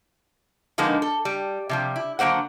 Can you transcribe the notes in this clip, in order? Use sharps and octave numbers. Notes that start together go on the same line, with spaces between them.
D3 F3 G#3 A#3 B3 D#4
A4
G3
C3 F3 G3
E4
D3 F#3 A#3 C5 F#5